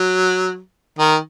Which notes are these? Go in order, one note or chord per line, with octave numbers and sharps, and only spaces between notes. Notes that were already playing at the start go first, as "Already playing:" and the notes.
Already playing: F#3
D#3